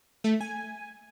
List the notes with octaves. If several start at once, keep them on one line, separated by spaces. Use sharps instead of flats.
A3
G#5